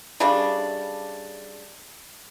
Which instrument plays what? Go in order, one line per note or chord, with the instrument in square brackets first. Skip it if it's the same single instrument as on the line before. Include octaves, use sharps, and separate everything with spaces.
[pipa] C#3 G3 A3 D4